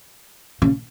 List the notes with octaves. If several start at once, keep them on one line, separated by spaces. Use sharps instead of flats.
C#3